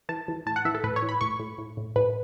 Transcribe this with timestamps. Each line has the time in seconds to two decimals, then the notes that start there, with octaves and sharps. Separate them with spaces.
0.09 E3 A5
0.28 E3
0.46 A2 A5
0.56 F#5
0.65 E3 E5
0.75 A4
0.84 A2 B4
0.96 C#5
1.02 E3
1.09 B5
1.21 A2 C#6
1.40 A2
1.58 A2
1.77 A2
1.96 A2 B4